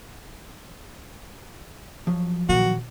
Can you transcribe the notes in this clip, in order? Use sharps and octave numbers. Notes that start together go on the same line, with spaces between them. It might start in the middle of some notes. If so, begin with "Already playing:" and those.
F3 F#3
A#2 D#3 F3 F#3 A#3 F#4